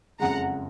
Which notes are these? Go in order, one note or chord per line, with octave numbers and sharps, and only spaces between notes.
F#1 F2 C#3 G#3 F#5 A#5